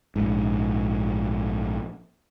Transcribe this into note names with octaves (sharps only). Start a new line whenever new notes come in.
A#1 G#2